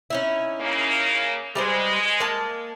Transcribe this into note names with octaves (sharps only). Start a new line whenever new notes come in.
C#4 D#4 E4
C#3 A#3
G3 G#3 B4 C5
A#3 A5